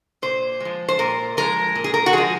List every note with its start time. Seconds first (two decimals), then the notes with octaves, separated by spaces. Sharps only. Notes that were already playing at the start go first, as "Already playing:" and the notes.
0.22 A#2 C5
0.60 F3 G#3
0.88 C5
0.99 A#2 A#4
1.37 F3 G#3 A#4
1.75 A#2
1.84 G#4
1.94 A#4
2.06 F#4
2.13 F3 G#3 G#4